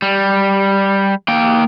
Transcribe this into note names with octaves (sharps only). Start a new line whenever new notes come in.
G3
A#3 G5